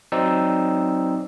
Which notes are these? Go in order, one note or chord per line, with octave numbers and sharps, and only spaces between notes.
F#3 C4 D#4 D5 E6